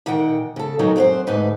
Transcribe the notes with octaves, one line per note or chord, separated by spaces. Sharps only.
A#2 D#3 A#4 F#5 G5
C#3 A4
A#2 D#3 F#3 B3 D#4
F#2 C4 E4 F#4 C5
D2 G#2 D#4 B4